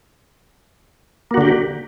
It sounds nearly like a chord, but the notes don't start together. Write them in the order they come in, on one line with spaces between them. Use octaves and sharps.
A#3 F#4 D3 G4